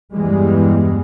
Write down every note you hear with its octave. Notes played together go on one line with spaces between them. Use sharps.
E2 G2 E3 G3 G#3